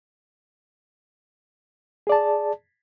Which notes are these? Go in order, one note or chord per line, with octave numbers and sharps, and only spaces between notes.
G#4 D5 A5